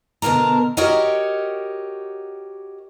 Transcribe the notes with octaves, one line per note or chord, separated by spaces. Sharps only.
B2 D3 A#4 A5 A#5
F#4 G4 A#4 C#5 D#5 F#5